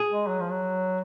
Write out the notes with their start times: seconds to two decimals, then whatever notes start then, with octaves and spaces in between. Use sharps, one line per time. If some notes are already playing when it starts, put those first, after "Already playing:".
Already playing: G#4
0.11 G#3
0.28 F#3
0.40 F3
0.51 F#3